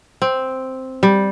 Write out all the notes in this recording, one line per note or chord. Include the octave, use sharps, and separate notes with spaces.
C4
G3